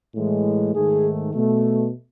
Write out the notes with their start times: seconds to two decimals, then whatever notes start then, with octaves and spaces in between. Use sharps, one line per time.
0.14 A2 E3 G#3
0.73 G#2 D#3 A3 G#4
1.33 B2 A3